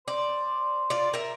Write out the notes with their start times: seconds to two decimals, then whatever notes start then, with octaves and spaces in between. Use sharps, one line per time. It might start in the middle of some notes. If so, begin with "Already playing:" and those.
0.08 C5 D5
0.90 F4 D5
1.14 A#4 E5